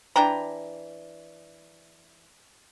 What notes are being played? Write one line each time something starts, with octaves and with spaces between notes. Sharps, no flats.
E3 D4 G5 A#5